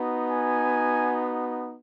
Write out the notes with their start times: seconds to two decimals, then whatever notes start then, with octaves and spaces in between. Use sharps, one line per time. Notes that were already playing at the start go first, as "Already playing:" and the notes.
Already playing: B3 D#4 F#4
0.31 G#5